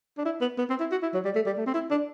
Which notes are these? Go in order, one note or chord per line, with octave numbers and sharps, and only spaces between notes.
D4
E4
B3
B3
C4
E4
F#4
E4
F#3
G3
A3
G3
A3
C4
E4
D4